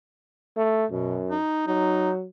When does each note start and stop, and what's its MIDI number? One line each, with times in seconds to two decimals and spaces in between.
0.57 0.86 57
0.90 1.37 42
0.90 1.19 47
1.30 1.65 63
1.67 2.26 54
1.67 2.10 63